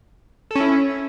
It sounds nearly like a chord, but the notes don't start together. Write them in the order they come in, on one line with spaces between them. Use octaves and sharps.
A4 C#4 E4